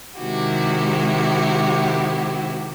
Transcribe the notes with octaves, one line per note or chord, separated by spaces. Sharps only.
C3 D#3 G#3 E4 F#4 G4